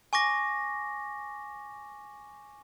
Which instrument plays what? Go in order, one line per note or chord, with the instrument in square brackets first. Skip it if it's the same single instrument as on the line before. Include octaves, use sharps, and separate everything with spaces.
[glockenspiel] G#5 C#6 D6 A#6